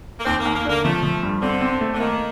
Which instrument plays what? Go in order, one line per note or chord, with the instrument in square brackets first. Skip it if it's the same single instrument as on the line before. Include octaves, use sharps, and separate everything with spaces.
[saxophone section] A#3
[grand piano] D#2 [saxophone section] C4
[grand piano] D#2 [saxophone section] A#3
[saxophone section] A#3
[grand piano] D3 [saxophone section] A#3
[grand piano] F3 [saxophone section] A3
[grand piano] F3
G2
[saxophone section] D3 [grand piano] C4
[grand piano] C4
A3
[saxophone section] D3
[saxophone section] D#3 [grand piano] A#3